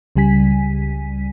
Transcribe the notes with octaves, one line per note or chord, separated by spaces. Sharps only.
C#2 C#3 G3 G#5 B6